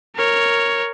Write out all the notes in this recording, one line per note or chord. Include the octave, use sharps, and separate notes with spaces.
A#4 C#5